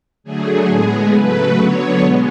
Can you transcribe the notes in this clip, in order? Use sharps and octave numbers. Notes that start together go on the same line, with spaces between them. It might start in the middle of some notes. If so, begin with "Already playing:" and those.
D3 F#3 A3 G#4
A2 G#3 B3
C#3 F#3 A3 B4
D3 F#3 B3 C#5
B2 G#3 B3